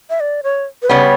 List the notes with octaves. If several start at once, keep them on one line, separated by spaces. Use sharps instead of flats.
E5
D5
C#5
B4
C#3 G3 B3 C#5